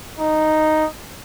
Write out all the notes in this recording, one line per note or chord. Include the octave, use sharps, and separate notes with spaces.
D#4